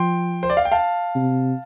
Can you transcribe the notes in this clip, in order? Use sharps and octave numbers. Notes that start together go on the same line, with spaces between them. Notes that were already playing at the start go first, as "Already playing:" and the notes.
Already playing: F3 G5 C6
C5
D5
F5
G5
F5 A5
C3